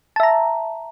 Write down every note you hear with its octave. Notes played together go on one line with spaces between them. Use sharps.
E5 A5 A#5